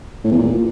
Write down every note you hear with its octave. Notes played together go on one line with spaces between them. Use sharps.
A2
E2
A#2